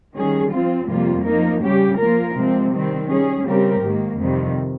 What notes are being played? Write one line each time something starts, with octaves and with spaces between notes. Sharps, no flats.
D#3 G3 C#4 G#4
F3 C4 F4
F2 C3 G3 A#3 F4
F3 A#3 D#4 A#4
C#3 G3 C#4 G4
F3 A#3 F4 A#4
C3 F3 G#3 C4
D#3 G3 C4
G3 C#4 G#4
C#3 G3 C4 G4 A#4
G#2 D#3 A#3
F2 C3 D#3 G3